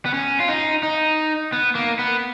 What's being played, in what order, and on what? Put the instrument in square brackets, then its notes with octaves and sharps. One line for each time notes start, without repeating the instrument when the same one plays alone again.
[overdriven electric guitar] B3
C#4
F4
D#4
D#4
B3
A#3
B3